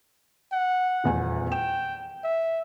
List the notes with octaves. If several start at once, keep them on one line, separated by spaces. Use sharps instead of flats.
F#5
D#1 E2 G#5
G5 E7
E5